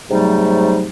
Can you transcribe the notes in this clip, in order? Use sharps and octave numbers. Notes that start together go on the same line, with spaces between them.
G#2 C3 F#3 G3 A3 D#4